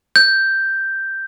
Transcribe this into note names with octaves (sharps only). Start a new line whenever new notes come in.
G6